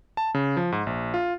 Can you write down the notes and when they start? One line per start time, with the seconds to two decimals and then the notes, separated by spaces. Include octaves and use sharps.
0.17 A5
0.34 C#3
0.57 F3
0.72 G#2
0.87 A#1
1.14 F4